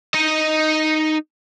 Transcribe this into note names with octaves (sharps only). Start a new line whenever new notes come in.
D#4 D#5